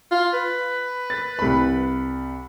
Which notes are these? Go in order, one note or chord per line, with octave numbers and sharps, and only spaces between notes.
F4
B4
A6
C2 B5